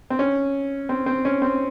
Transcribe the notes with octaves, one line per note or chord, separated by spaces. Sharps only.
C4
C#4
C4
C4
C#4
C4